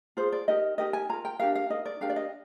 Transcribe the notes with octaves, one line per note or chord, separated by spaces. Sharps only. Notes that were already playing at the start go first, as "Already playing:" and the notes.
F4 G#4 C5
D5
D#4 G4 A#4 D#5
D#4 G4 A#4 D#5
G#5
F4 A#4 A#5
G5
D4 G4 A#4 F5
F5
D#4 A#4 D#5
D5
D4 G4 A#4 F5
D5
D#5